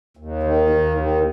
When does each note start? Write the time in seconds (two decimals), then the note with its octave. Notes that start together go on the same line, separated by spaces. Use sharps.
0.17 D#2
0.43 D#3
0.70 D#2
0.97 D#3